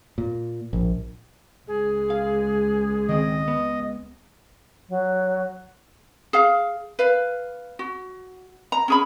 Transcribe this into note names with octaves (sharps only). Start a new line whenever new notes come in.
A#2
A#1
C#2 G#3 G#4
F5
D#3 C4 D#5
B3
F#3
G#4 F5
B4 F5
F#4
A#5
C#4 G#4 B5